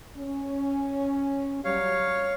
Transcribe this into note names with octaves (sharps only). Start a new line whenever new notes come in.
C#4
F#3 G3 C#5 F5